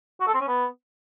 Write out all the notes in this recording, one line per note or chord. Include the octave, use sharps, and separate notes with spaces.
F#4
A4
C4
C#4
B3